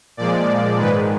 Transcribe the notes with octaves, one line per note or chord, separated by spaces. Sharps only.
A#2 F3 G#3 D5
G#2 D#3 G#3 B4